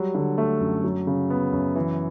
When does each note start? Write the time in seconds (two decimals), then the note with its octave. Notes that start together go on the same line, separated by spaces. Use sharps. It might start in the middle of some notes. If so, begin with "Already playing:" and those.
Already playing: F#3 G3
0.15 D3
0.38 A3
0.60 F#2
0.84 F#3
1.07 C#3
1.30 B3
1.53 F#2
1.75 E3